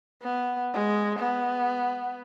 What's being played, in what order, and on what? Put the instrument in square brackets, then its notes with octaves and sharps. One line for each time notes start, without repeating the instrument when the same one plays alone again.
[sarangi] B3
G#3
B3